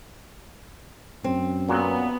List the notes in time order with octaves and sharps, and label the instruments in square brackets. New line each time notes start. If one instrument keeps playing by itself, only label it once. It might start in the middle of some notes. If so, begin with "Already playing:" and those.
[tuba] F#2 [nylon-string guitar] C4
[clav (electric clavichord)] A#2 F#3 [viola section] B3